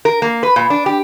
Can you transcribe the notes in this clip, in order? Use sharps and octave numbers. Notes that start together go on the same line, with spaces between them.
A#4
A#3
B4
A#2
D4
G4